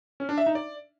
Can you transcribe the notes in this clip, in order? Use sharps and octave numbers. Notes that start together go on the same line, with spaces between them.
C#4
D4
E5
D#4
D5